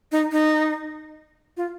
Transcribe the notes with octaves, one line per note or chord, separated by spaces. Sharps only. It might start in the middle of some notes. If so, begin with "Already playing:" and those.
D#4
D#4
F4